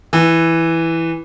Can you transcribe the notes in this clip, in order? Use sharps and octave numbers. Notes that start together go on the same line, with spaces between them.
E3